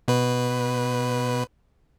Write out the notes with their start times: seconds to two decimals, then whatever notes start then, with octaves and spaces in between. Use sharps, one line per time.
0.08 B2 B4